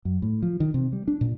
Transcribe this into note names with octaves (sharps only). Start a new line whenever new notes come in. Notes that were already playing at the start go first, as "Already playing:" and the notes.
F#2
A2
F3
D#3
C3
G3
D4
A#2